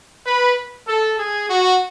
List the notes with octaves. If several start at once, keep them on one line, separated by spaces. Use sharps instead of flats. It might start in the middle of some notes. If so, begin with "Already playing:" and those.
B4
A4
G#4
F#4